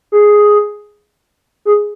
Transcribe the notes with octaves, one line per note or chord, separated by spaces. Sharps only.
G#4
G#4